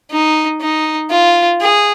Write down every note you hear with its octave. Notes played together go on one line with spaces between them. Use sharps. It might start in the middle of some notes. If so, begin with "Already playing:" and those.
D#4
D#4
F4
G#4